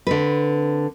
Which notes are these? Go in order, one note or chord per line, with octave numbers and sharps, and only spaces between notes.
D3 C4 B4